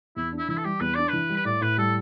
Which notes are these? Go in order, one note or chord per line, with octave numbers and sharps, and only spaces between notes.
E2 E4
D4
E4
E3 E4
A4
G3 G4
E2 B4
D4 D5
E3 B4
G3
B4
A2 D5
A2 B4
G3 A4